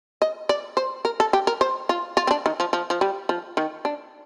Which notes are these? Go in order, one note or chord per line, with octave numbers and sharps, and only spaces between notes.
D#5
D5
C5
A#4
A4
G4
A#4
C5
F4
F4
C4
D4
D#3
F3
F3
F3
G3
F3
D#3
D4